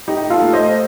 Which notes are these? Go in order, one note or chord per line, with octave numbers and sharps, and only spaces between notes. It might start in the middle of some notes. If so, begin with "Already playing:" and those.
A2 D#4 G4
F4 A4
A3
C5 D#5